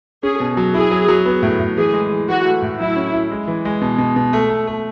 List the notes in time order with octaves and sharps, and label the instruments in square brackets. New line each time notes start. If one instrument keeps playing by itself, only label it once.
[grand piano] C#4 [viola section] G#4
[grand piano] B2
F#3
[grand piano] E4 [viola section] G#4
[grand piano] F#3
F#3
B3
A2
A2
[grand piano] E3 [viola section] G#4
[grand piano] G#3
E3
[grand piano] E3 [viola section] F#4
[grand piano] A3
A2
[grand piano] F#3 [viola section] E4
[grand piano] C#4
E4
G#3
E3
G#3
B2
B2
B2
A3
A3
A3